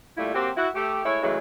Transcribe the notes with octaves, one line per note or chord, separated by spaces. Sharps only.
A#2 G3 A3 E4 F4
F#3 A#3 C4 F#4 G4
E4 F#4
A3 G4
G#3 A3 E4 C#5
C#3 E3 F#3 G#3 A3